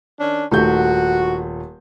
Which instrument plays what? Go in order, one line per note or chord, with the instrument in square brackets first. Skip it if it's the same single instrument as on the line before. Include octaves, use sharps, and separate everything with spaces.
[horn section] D#3 C#4 D4
[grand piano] D#1 A3 G6 [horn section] F#4